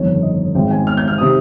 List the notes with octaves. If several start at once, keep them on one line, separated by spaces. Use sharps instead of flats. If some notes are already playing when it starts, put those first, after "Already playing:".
Already playing: G1 F2 D#3 C#5
D#5
G#1 G#2 D#3 G5
G#5
F6
G6
F6
C3 D#3 D#6